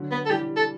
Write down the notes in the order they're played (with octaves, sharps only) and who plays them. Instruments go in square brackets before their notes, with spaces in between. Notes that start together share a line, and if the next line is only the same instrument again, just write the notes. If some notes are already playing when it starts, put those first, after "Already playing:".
Already playing: [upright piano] D3 F#3
[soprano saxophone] B3
A4
[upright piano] E3 G3 [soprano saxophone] G4
[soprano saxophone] A4